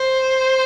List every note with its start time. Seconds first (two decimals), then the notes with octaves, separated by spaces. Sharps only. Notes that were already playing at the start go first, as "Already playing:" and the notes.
Already playing: C5